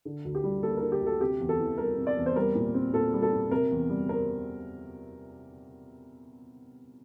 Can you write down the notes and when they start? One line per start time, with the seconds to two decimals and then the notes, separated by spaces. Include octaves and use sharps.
0.05 D3
0.25 D2
0.35 G4
0.44 G3
0.63 A#3 A4
0.77 D3 A#4
0.92 G4
1.01 D2
1.06 A4
1.21 C3 G4
1.40 E2
1.49 A4
1.59 E3
1.78 G3 A#4
1.98 C3
2.07 D5
2.17 E2
2.26 C5
2.36 G3 A#4
2.55 A#2
2.74 C4
2.93 A#2 A4
3.14 G3
3.22 A4
3.32 A#2
3.51 C3 A#4
3.71 E2
3.89 G3
4.09 C4 A#4